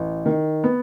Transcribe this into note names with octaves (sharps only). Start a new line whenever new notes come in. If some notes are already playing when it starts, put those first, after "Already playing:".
Already playing: A1
D#3
B3